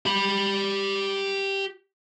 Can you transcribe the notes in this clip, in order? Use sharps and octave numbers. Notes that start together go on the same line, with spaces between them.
G4 B5